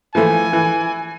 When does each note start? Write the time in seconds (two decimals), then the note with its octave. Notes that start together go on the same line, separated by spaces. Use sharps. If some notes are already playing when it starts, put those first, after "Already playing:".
0.15 E3 F3 A3 G#5
0.53 E3